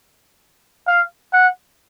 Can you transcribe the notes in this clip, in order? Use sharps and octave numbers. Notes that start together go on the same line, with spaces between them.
F5
F#5